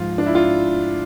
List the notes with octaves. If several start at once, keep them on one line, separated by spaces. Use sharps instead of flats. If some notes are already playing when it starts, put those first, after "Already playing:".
Already playing: G#2 F3 F4
D4
E4
F4